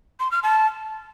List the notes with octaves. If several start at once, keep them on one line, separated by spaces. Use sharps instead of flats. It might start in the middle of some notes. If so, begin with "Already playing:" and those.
C6
F6
A5